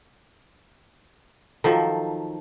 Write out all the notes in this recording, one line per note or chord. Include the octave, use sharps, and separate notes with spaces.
D#3 F3 F#3 A4